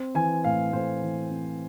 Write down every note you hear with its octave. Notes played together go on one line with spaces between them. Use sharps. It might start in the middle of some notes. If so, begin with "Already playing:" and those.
Already playing: C4
E3 G#5
A2 F5
A2 C5
E3
C4